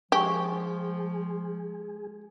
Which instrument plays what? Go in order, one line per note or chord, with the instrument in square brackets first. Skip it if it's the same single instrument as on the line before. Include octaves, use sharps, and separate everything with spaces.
[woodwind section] F3 [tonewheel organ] G#3 G#4 [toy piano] D4 G#5 C#6 [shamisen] G4